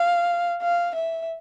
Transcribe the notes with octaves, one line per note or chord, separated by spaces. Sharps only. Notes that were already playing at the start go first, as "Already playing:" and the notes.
Already playing: F5
F5
E5